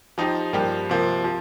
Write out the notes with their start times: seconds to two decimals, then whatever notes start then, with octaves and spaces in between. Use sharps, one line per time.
0.18 F3 D#4 G4
0.53 G2 F3 A#3 G4
0.90 C3 F3 A#3
1.24 F3